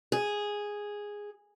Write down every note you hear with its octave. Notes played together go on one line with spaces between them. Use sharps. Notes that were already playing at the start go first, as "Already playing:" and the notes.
G#4